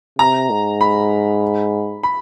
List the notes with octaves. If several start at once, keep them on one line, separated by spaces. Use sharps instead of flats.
C3 A#5
G#2
B5
B5